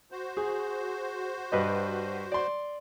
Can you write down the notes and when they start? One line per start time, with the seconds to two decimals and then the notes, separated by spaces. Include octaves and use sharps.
0.12 F#4 C5
0.37 G#4
1.52 G2 B4 D#5
2.32 D5 C6